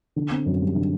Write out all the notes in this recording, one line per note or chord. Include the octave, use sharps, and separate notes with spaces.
D3
C4
F#2
G3
D3